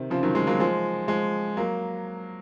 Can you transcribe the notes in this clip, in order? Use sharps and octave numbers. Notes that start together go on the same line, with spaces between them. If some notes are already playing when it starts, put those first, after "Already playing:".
Already playing: C3 D#3
C#3 F3
D#3 F#3
F3 G#3
F#3 A#3
F3 G#3
F3 G#3
F#3 A#3